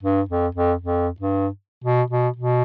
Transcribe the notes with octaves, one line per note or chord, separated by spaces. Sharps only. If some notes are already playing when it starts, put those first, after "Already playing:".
G2
F2
F2
F2
G2
B2
B2
B2